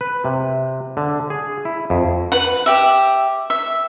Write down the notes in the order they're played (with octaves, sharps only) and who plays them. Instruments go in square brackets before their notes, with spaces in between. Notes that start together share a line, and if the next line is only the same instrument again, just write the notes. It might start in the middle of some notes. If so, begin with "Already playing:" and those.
[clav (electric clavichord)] B4
C3
D3
G#4
E4
F2
[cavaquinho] B4 F#5
G4 E5
E5